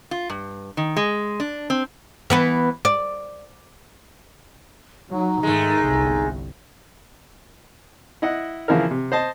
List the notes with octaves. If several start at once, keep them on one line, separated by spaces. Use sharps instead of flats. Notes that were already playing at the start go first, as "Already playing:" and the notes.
F4
G2
D#3
G#3
D4
C4
E3 B3 B4
D5
F#3 D#4
G#2 D#3 G#3 A3
G1 C2
E4 D#5 F#5
C#3 E3 F3 E4 A#4
C3
C5 D#5 A5